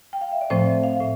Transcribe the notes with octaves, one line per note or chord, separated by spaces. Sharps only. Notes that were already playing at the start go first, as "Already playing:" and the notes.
G5
F5
E5
D5
A2 F3 A3 C4 C5
E5
F5
A2 E5